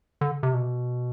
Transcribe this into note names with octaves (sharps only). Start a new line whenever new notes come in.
D3
C3
B2